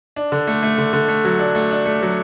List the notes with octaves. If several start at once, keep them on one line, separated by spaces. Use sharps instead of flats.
D4
D3
A3
A3
D3
D3
A3
F#3
D4
A3
D4
A3
F#3